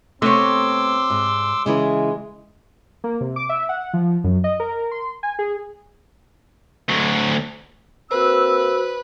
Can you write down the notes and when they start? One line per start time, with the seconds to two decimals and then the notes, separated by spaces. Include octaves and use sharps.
0.22 C3 A3 B3 C4 C#5 C6 D6 E6
1.10 G#2
1.66 C#3 E3 G#3 E4
3.04 A#3
3.21 C3
3.36 D6
3.49 E5
3.69 F#5
3.94 F3
4.24 F#2
4.44 D#5
4.60 A#4
4.91 C6
5.23 G#5
5.39 G#4
6.89 D2 F#3
8.11 A#3 C4 F#4 B4 C5 E6